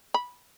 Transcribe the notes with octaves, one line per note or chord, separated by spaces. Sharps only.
B5